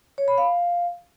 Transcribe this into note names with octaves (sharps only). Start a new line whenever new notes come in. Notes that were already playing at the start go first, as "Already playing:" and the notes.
C#5
B5
F5